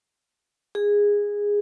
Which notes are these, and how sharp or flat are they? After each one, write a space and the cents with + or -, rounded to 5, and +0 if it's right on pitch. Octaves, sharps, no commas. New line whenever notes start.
G#4 -15